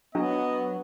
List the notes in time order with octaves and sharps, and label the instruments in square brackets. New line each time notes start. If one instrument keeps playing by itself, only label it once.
[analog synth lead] F#3 [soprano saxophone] B3 [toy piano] D4 [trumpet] D#5